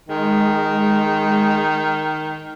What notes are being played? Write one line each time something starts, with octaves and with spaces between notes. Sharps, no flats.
D#3 G#3